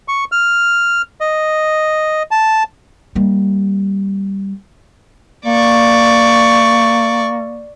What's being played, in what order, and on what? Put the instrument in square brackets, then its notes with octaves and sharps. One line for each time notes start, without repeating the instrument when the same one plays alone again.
[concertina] C#6
F6
D#5
A5
[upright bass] G3 A#3
[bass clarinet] A#3 [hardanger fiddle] D5 C#6